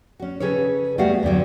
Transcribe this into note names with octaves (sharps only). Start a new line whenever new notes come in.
C#4 F#4
C#3 G#4 A4 B4 C#5
G3 A3 B3 F#4 F5 F#5
E2 G2 D3 F#3